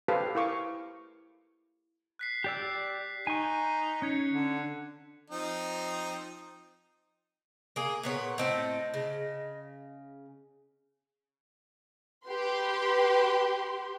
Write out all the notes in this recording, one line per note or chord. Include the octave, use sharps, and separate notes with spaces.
G4 A4 B4 C5 F5 A5
E4 A#4 F5 C#6 D6
F#6 B6 C7
G4 D5 E6 G6
D#4 G#5 C#6
C#4 F#6 G#6 C#7
D3
F3 C4 D#4
A#3 G#4
A#2 B3 C#5
A2 C4 A4 D#5
C#3
G4 B4 C6